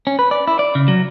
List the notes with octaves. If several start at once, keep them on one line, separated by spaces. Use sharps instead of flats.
C#4
B4
D5
E4
D5
C#3
F#3